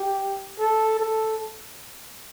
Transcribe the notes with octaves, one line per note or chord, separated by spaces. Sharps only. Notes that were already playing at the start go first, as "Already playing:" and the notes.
Already playing: G4
A4
A4